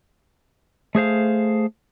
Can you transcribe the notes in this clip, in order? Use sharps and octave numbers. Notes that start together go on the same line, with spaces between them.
A3 G#4 C5 F5